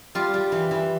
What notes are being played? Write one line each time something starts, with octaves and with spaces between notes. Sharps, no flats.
G3 F4
G3
E3
E3